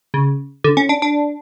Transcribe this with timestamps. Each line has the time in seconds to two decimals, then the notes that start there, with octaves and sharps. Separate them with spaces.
0.14 C#3
0.64 D3
0.77 C#4
0.89 D4
1.02 D4